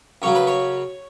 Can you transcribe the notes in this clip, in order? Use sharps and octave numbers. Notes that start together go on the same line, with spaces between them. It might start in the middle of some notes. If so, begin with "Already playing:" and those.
F#2 C#3 F#3 C#5
B4
C#5